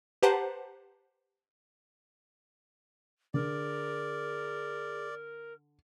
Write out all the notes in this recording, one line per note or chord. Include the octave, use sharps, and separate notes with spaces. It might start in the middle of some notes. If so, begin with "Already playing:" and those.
G4 B4 C5 F#5 A5 A#5
D3 G#4 A#4 D5